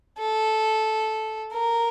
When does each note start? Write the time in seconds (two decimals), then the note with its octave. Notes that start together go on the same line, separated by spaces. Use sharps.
0.19 A4
1.52 A#4